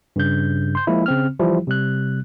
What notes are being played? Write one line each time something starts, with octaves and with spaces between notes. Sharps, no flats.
G2 C#3 G6
C6 G6
F3 G#3 A#3 E4
C#3 C4 F6
E3 F3 G3 E4 G4
C3 G3 F#6